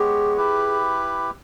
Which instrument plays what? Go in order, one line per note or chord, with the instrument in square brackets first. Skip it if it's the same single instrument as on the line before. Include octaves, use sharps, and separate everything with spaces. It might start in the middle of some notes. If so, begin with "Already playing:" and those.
Already playing: [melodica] G#3 B3 G4 C#5 [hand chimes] G#4
[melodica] E4 G4 B4